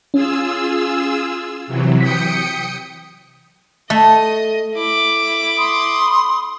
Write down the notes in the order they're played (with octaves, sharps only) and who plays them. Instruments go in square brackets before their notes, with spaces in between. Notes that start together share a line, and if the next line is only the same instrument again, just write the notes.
[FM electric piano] C#4 [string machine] F4 G#4 E6
[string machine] C3 E3 F#3
[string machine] G5 D#6 C#7 [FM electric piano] B6
[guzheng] A3 [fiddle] D#5
[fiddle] E4 D6
[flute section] B5 C6 D#6